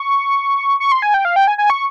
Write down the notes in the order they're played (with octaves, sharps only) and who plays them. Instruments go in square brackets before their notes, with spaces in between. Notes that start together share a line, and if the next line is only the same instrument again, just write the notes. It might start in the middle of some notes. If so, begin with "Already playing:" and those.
Already playing: [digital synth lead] C#6
C#6
C6
G#5
G5
F5
G5
G#5
G#5
C#6